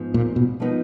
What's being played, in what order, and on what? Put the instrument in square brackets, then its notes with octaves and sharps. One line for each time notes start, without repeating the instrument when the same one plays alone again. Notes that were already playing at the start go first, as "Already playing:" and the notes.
Already playing: [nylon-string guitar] G#2 F3 B3 D#4
[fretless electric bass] A#2
B2
[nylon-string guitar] F3 B3 D#4